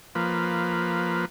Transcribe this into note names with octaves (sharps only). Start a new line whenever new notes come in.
F3 A#3 B4